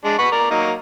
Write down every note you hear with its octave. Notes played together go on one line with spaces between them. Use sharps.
G#3 D4
B4 F#5 C#6
A#4 D5
F#3 A#3 D#4